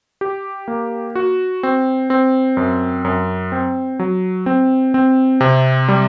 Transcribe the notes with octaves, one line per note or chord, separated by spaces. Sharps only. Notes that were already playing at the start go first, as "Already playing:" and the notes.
G4
A#3
F#4
C4
C4
F#2
F#2
C4
F#3
C4
C4
C3
G3